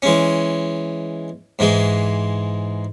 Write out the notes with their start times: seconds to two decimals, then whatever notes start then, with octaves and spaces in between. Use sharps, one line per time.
0.02 E3 G#3 C#4
1.59 G#2 E3 G#3